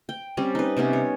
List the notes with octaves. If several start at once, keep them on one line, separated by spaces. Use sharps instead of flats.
G5
G3 C4 C#4
D#4 B4
C3 G3 B3 C#4
C#5